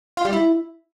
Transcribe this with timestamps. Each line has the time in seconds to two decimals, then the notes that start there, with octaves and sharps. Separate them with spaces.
0.17 F4
0.25 G3
0.33 E4